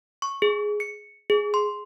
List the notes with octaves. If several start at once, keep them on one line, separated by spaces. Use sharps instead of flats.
C#6
G#4
C#7
G#4
C6